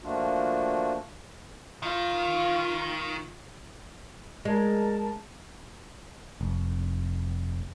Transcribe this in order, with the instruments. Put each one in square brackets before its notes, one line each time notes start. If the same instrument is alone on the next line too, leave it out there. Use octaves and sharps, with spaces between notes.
[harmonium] F3 A3 A#3 D4 F4 F#4
[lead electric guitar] D#3 [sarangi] F4
[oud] G#3 [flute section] A#4 A5
[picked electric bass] F1